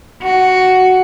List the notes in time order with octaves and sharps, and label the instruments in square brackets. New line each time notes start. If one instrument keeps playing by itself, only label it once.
[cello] F#4